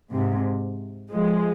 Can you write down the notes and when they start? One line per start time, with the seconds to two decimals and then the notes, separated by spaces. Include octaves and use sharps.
0.12 G#2 C3
1.12 F3 G#3